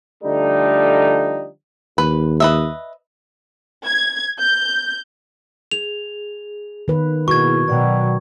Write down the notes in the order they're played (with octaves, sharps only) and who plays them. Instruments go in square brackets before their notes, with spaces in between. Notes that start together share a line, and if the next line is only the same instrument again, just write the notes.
[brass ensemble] D3 F3 G3 A3 D#4
[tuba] D#2 [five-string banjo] B4
[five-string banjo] B4 D#5 E5
[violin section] G#6
G6
[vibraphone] G#4 [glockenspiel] F7
[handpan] D#3 B4
[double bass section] B2 [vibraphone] A#3 E4 G#4 [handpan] F#4 B4 [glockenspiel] C#6 G#6
[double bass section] B2 F#3 [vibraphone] D5 F#5 G5